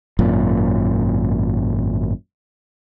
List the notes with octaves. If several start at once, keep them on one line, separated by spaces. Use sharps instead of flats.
G#1 F#2 A#2